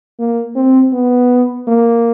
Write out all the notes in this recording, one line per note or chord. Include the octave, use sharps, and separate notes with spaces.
A#3
C4
B3
A#3